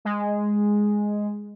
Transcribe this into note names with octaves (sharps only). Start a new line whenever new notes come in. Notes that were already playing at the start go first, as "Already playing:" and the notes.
G#3